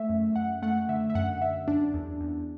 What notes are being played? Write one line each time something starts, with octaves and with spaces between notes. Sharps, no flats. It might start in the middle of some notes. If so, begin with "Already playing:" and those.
Already playing: A3 E5
F#2
F#2 F#5
A3 F#5
D3 E5
E5
F#2 F#5
F#2 E5
F#2 D4
E2
E2